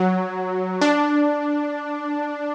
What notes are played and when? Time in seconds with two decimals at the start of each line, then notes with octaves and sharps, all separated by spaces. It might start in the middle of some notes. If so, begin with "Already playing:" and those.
Already playing: F#3
0.81 D4